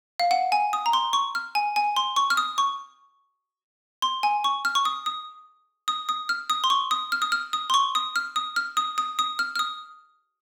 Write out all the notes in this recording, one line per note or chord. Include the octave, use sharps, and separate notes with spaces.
F5
F#5
G#5
D#6
A#5
C6
C#6
F6
G#5
G#5
C6
C#6
F6
D#6
C#6
C6
G#5
C#6
F6
C#6
D#6
D#6
D#6
D#6
F6
D#6
C6
C#6
D#6
F6
D#6
F6
D#6
C6
C#6
D#6
F6
D#6
F6
D#6
D#6
D#6
F6
F6
D#6